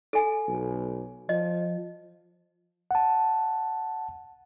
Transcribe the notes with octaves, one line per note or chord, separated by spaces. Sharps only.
A4 G#5
B1
F3 D#5
F#5 A5